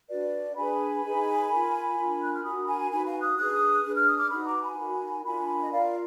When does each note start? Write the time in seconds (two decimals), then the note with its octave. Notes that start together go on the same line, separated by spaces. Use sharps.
0.09 D4 F#4 B4 D5
0.56 D4 G#4 B4 G#5 B5
1.04 D#4 G#4 B4
1.50 F4 A#4
1.96 D4 F4 A#4
2.22 F#6
2.33 F6
2.43 D4 F#4 A#4 B5 D#6
2.67 G#5 B5
2.90 D#4 F#4 B4 G#5 B5
3.06 F5 G#5
3.21 D#6 F#6
3.37 D4 G#4 B4 D#6 F#6
3.84 D4 G#4 B4 F#6
3.95 F6
4.06 D#6
4.17 D6 F6
4.30 D#4 F#4 B4 B5 D#6
4.46 A#5 D6
4.62 G#5 B5
4.78 D#4 F#4 A#4
5.24 D4 F4 A#4 G#5 B5
5.60 D#5
5.71 F4 A#4 D5 F5